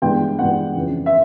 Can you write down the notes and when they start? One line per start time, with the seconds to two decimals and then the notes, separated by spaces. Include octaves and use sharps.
0.02 G2 E3 G#3 B3 G5
0.39 G2 E3 G#3 B3 F#5
0.75 F2 C#3 E3
1.06 E5